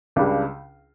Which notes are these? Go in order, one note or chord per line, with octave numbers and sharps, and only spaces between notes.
C#2 C#3 G3 D4